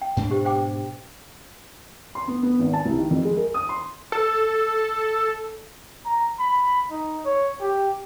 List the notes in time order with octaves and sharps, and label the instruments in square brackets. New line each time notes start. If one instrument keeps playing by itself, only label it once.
[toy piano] G5
[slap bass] G#2 B2 D4 [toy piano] B4
[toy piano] G4 C5
C5 G5 D6
[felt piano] C6
B3
B3
G#1
A5
C2
D#3
F2
G#3
A#4
D#6
C6
[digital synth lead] A4
[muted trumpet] A#5
B5
D#4
C#5
G4